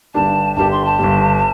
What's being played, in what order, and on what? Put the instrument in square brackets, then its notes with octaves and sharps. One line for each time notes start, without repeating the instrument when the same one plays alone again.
[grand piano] G1 G2 G3 D4 G4 [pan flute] A5
[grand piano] G1 G2 G3 D4 G4 [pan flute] A5
[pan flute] C6
A5
[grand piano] G1 G2 G3